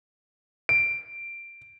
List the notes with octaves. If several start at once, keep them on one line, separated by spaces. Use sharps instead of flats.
D7